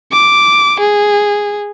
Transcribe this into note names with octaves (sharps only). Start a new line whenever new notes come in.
D6
G#4